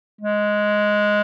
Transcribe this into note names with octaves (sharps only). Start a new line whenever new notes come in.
G#3